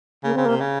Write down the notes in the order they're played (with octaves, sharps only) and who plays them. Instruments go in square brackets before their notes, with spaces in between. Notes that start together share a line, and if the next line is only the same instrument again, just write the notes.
[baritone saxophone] C#3 [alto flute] A#3
[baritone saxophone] C#3 [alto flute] C4
[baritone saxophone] C3 [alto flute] A#3
[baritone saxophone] C#3